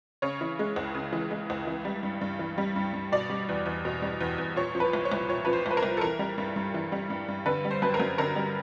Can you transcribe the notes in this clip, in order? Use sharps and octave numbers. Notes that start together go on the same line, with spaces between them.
C#3 C#5
E3
G#3
C#2
C#3
E3
G#3
C#2
E3
G3
G2
G2
E3
G3
G2
G2
B2 D5
G3
E2
E2
B2
G3
E2
E2
A#2 C#5
F3
B4
C2
C#5
C2
A#2 C#5
F3 B4
C5
C2 B4
A#4
C2
A4
E3 A#4
G3
G2
G2
E3
G3
G2
G2
D3 B4
G3
C5
F#2 B4
A#4
F#2
D3 A#4
G3